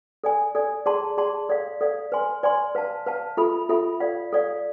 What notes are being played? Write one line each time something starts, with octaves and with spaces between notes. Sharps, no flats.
A4 D5 G#5
A4 D5 G#5
G#4 D5 A5 C6
G#4 D5 A5 C6
A4 D5 F5
A4 D5 F5
B4 D5 G#5 C6
B4 D5 G#5 C6
B4 F5 A5
B4 F5 A5
F4 A4 E5 B5
F4 A4 E5 B5
A4 D5 F5
A4 D5 F5